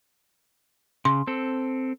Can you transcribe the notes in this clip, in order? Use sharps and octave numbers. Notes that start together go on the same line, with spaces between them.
C#3 C6
C4 A4